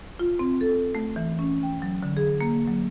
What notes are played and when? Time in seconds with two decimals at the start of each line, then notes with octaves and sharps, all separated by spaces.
0.19 F4
0.39 C4
0.61 A4
0.95 A3
1.16 E3
1.39 C#4
1.63 G5
1.82 F#3
2.03 D3
2.17 G#4
2.40 A#3
2.67 F#3